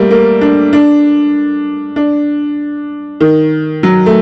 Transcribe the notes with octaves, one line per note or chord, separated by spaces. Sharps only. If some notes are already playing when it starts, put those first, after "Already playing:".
Already playing: G3 A3 A#3
A#3
D4
D4
D4
D#3
F#3
A3